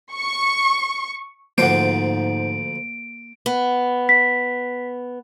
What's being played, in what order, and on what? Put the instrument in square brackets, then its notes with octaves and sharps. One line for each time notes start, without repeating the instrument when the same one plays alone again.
[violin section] C#6
[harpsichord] D2 F3 C5 [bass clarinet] G#2 [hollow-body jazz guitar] A#3 F#5 [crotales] D7
[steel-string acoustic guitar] B3
[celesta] B6